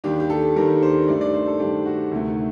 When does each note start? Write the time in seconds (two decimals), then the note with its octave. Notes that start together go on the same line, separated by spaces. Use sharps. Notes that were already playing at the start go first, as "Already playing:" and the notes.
0.04 D#2 D#3 G3 D4 G4
0.20 G4
0.30 A4
0.56 D#2 D#3 G3 D4 A#4
0.82 C5
1.08 G2 D#3 A3 D4 D5
1.21 D5
1.34 C5
1.47 A4
1.59 G2 D#3 A3 D4 G4
1.86 F#4
2.12 D2 C3 D#3 A3